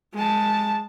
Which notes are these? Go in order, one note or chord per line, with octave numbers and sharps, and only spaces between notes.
G#3 A5